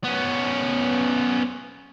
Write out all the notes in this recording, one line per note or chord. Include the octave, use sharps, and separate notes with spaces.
B3 C#4